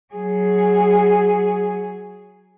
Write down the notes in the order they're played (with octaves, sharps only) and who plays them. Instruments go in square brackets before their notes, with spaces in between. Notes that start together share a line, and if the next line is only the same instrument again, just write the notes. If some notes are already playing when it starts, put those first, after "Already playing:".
[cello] F#3 G#4